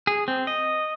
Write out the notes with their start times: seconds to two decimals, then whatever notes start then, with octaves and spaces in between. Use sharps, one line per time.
0.07 G#4
0.28 C4
0.47 D#5